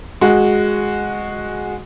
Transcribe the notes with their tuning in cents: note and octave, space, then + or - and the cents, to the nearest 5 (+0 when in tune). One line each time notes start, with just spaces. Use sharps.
G#3 +0 F#4 -10